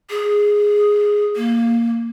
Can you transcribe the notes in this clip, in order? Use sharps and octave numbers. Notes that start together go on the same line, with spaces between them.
G#4
A#3